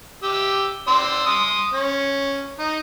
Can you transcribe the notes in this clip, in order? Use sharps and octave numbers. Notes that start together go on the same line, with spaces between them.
G4 E6
D5 C6 E6
C6 D#6
C#4
D#4